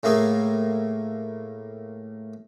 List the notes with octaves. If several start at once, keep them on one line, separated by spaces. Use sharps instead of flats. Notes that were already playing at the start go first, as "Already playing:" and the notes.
A2 A3 A#3 G#4